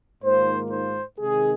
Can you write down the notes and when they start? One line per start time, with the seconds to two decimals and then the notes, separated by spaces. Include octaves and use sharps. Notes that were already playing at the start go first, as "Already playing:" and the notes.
0.23 G#2 D#3 A#3 F4 C5
0.70 C5
1.19 C3 D#3 G#3 G#4